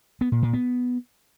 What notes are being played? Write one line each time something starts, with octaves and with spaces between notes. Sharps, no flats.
B3
A#2
A#2
B3